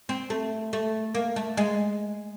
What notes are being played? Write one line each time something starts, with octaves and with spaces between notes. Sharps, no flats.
C4
A3
A3
A#3
A3
G#3